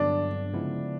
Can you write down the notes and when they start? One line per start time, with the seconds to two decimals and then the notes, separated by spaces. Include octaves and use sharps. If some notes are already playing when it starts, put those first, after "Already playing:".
Already playing: G2 D3 F#3 B3 D4
0.53 C#3 F3 G#3 B3 E4